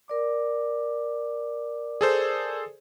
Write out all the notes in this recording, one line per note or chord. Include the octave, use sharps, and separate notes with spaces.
A#4 D5 D6
G#4 A4 C5